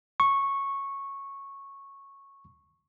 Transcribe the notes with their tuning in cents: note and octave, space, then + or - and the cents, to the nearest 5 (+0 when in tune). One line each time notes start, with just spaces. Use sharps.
C#6 -10